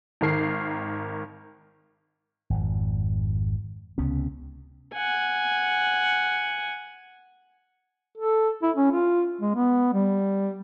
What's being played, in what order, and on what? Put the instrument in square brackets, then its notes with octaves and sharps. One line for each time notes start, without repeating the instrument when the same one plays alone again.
[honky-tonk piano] G#1 D#3 A#4 C7
[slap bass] G#1 F2
C#2 C3 B3 C#4
[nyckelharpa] F#5 G#5
[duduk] A4
E4
C#4
F4
G#3
B3
G3